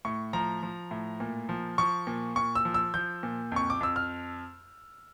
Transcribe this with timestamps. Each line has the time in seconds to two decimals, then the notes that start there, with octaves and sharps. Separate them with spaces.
0.05 A2 C#6
0.33 F3 A#5
0.63 F3
0.91 A2
1.20 A#2
1.49 F3
1.78 F3 C#6
2.07 A#2
2.36 A#2 C#6
2.55 E6
2.65 F3
2.74 E6
2.94 F3 G6
3.23 A#2
3.52 F2 C#6
3.70 D6
3.80 F2 E6
3.96 F6